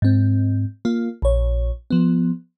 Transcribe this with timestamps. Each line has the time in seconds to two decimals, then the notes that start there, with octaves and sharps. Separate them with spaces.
0.02 G#2 C4
0.85 A#3 F4
1.22 A#1 C#5
1.90 F3 B3